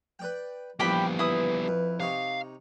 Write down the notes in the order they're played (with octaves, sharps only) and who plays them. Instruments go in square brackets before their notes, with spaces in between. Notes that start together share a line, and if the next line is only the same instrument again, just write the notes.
[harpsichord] B4 D5 G5
[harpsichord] A#1 E2 F3 [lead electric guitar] G3 B3 [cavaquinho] G4 G5 B5
[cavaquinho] E4 D#6 [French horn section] B4
[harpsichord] F2
[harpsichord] C3 D#4 C#5 [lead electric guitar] F5